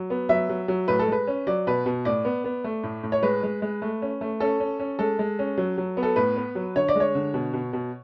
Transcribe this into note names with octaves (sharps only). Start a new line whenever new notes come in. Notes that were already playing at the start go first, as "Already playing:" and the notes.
Already playing: F#3
B3
F#3 E5
F#3
F#3
A2 B4
A4
G#3 B4
C#4
F#3 D5
B2 B4
B2
A2 D5
B3
B3
A3
A2
A2
C#5
G#3 B4
G#3
G#3
A3
C#4
A3
C#4 A4
C#4
C#4
G#3 A4
G#3
C#4
F#3
F#3
B3
A4
A2 B4
B3
F#3
D3 C#5
D5
G#3 C#5
D3
B2
B2
B2